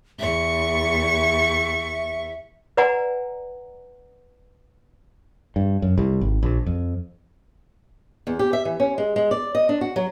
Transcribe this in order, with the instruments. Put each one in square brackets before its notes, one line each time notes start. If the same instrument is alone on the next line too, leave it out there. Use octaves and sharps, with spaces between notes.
[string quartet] E2 C#6 [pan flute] E5
[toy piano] B4 D5 F#5 G#5 A#5
[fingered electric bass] G2
F#2
C2
G#1
A#1
F2
[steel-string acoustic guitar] E2
G4
E5
E3
C#4
G#3
G#3
D5
D#5
D4
F#4
F#3